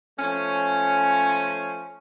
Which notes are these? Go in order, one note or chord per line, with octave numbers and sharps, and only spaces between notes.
F3 A3 C#4